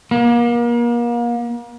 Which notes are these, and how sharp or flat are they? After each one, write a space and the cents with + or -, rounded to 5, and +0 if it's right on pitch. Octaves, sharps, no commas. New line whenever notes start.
A#3 +35